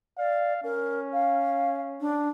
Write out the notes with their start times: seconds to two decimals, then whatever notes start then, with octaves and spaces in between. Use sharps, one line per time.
0.18 D5 F5
0.64 C#4 A#4
1.13 F5
2.00 D4